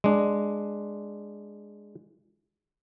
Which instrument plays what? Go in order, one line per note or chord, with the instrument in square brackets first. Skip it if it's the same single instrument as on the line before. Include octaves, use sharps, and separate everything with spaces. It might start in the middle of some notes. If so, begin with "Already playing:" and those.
[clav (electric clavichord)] G#3 D4